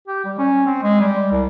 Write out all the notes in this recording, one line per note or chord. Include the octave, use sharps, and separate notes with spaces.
G4
G3
C#4
C4
G#3
G3
C2